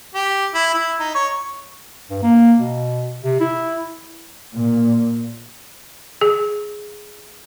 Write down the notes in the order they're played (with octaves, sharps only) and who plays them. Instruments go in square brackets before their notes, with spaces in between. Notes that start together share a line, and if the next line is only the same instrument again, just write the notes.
[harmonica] G4
E4
E4
D#4
C#5
[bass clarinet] G2
A#3
B2
C3
E4
[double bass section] A#2
[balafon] G#4